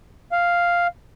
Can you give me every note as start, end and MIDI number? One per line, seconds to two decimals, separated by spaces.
0.32 0.87 77